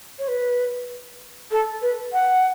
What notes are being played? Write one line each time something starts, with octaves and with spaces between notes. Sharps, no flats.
C#5
B4
A4
B4
F#5